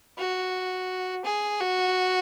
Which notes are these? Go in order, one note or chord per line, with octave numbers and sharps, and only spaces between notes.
F#4
G#4
F#4